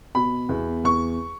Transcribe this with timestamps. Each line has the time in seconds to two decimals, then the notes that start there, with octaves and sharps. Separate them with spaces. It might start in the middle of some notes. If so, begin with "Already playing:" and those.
0.15 B2 B5
0.49 E2
0.84 E2 C#6